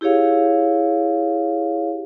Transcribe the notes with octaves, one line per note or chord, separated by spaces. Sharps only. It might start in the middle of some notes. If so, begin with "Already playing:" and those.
E4 G4 G#4 C#5 F5